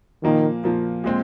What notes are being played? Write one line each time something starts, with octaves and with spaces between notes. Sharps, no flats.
A#2 D#3 F3 A#3
A#2 F3 A#3
A#2 G#3 C4